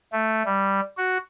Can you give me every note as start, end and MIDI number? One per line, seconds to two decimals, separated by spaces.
0.12 0.43 57
0.45 0.80 55
0.98 1.18 66